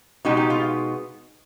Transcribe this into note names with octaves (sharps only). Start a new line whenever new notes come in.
B2 G#3 B3 D#4 G4
G4
F4